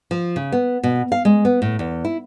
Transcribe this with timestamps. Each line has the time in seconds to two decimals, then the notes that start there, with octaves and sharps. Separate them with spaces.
0.11 F3
0.36 C#3
0.52 B3
0.83 B2
1.12 F5
1.25 G#3
1.45 B3
1.62 A2
1.79 E2
2.05 E4